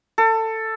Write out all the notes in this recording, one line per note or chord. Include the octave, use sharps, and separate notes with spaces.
A4